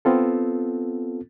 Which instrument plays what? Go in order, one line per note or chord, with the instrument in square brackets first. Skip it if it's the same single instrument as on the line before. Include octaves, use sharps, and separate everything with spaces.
[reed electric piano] B3 C4 F4 A4